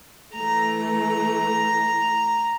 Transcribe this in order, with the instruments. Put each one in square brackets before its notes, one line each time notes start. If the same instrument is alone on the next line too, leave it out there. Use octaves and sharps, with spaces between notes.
[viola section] E3 A3 [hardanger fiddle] A#5